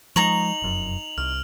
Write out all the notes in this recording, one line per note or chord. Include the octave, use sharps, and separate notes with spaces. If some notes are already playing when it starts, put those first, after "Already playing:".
F3 G#3 D#4 A#5 C#6 F7 F#7
F1 F#2
C2 F6